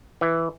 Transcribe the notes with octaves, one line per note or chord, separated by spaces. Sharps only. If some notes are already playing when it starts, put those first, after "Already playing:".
E3